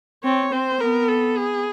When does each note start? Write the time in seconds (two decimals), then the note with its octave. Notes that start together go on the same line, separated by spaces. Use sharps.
0.24 C4 C#5
0.52 C4 C5
0.81 B3 A#4
1.09 A4
1.37 G#4